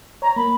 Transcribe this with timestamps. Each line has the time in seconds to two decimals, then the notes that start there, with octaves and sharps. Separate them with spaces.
0.22 C#5 A#5
0.36 A#3 B5